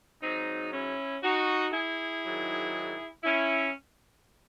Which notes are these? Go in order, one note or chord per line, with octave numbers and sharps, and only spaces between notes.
G#2 F#3 C4 D#4
C#4 E4
D#4 F#4
E4 G#4
G#2 D#3 F#3
C#4 E4